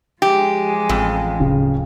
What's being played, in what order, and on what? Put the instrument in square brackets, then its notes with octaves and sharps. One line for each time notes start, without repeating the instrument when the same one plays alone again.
[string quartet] F3 G#3 [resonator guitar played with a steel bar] G4
[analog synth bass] A1 [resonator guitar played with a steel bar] F2
[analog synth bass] D1 [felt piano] C#3